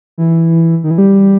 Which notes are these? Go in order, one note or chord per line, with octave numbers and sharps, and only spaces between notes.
E3
D#3
E3
G3